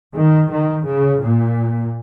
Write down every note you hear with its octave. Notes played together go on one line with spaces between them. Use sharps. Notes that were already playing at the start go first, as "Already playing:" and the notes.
D#3
D#3
C#3
A#2